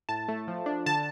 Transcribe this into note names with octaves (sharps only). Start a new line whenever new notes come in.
A2 A5
A3
F3
D4
D3 A5